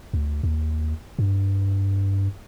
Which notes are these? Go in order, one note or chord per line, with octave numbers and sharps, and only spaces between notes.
D2
D#2
G2